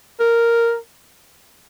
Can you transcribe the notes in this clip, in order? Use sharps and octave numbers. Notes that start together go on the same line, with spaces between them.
A#4